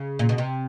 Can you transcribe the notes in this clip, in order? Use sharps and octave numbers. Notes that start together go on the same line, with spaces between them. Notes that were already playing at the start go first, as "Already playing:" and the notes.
Already playing: C#3
A#2
B2
C3